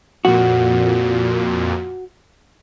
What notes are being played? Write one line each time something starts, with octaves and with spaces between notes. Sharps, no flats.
F2 A#2 F#4